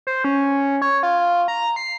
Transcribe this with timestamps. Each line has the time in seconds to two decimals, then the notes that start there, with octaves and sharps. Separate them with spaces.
0.07 C5
0.24 C#4
0.82 C#5
1.03 F4
1.48 A#5
1.76 C7